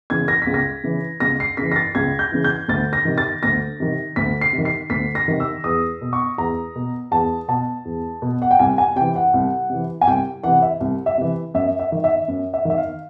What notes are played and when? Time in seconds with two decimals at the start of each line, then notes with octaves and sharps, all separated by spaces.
0.10 C#3 E3 G#6
0.28 A#6
0.42 C#2 B6
0.54 A#6
0.84 C#3 E3
1.20 C#2 A#6
1.40 C7
1.57 C#3 E3 B6
1.72 A#6
1.76 A6
1.95 C#2 G#6
2.19 G6
2.32 C#3 E3
2.44 G6
2.68 D2 A6
2.93 A#6
3.05 C3 D#3
3.18 A6
3.43 D2 A#6
3.80 C3 D#3
4.16 D2 B6
4.41 C7
4.53 C3
4.58 D#3
4.65 C7
4.90 D2 B6
5.15 A#6
5.28 C3 D#3
5.40 E6
5.64 E2 D#6
6.01 B2
6.13 C#6
6.38 E2 A#5
6.75 B2
7.11 E2 A5
7.48 B2 A5
7.85 E2
8.22 B2
8.42 F#5
8.51 G5
8.59 C2 G#5
8.78 G#5
8.96 C3 E3 G5
9.15 F#5
9.34 C2
9.70 C3 E3
10.01 G#5
10.07 C2 G5
10.44 C3 E3 F#5
10.62 E5
10.81 C2
11.06 E5
11.18 C3 E3
11.54 F#2 E5
11.79 E5
11.92 D#3
12.04 E5
12.28 F#2
12.54 E5
12.65 D#3 E5
12.78 F5